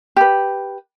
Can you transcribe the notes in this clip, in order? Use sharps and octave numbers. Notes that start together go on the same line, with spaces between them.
G4 B4